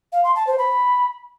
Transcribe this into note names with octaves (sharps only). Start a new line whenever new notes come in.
F5
C6
A5
C5
B5